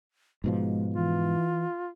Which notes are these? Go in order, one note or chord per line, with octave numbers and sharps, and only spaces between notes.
G#2 B2 F3 G#3
E3 F4